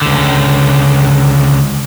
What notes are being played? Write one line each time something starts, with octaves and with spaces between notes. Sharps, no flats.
C#2 D3